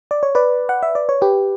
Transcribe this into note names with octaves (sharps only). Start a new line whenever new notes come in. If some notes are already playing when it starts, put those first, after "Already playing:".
D5
C#5
B4 D5
F#5
E5
D5
C#5
G4 B4